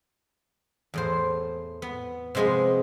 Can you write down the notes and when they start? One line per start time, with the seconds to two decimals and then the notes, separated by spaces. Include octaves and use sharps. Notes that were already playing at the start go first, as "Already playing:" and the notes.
0.94 E2 A2 C5
1.82 B3
2.35 C3 F3 G#3 B3 G#4